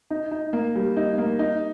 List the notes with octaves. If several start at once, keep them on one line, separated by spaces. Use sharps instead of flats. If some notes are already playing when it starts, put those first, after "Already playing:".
D#4
D#4
A#3
G3
D#4
A#3
D#4